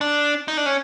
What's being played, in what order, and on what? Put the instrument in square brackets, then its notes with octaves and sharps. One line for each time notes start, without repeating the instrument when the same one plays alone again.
[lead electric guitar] D4
D#4
D4
C#4